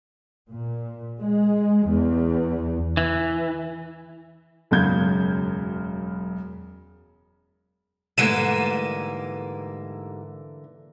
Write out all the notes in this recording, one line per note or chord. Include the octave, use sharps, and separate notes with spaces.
A#2
G#3
E2
E3
E1 F#2 C#3 G6 G#6
G#2 D3 E3 G3 A3 A#3 D#7 E7